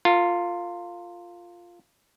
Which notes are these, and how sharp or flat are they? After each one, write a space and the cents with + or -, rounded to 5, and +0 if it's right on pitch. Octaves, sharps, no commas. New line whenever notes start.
F4 +0 A#4 -40